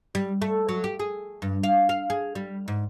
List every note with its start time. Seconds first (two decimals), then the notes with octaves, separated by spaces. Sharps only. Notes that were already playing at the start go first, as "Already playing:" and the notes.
0.15 G3
0.42 A3
0.69 F#3
0.84 G4
0.99 G#4
1.42 G2
1.63 F5
1.89 F5
2.10 G#4
2.35 G3
2.68 G#2